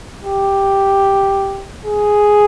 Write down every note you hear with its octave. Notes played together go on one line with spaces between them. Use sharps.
G4
G#4